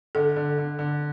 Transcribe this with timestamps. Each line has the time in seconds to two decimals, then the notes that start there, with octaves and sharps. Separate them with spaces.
0.15 D3 A4
0.36 D3
0.58 D3
0.79 D3